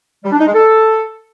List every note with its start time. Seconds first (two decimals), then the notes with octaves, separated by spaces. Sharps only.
0.24 G3
0.31 D4
0.39 D#4
0.46 G#3
0.54 A4